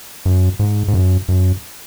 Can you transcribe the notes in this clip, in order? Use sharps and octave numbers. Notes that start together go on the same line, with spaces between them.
F#2
G#2
G#2
F#2
F#2